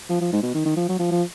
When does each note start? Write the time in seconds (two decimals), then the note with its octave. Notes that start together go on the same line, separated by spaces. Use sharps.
0.09 F3
0.21 F3
0.32 G#2
0.43 B2
0.54 D#3
0.65 D#3
0.76 F3
0.89 F#3
0.99 F3
1.11 F3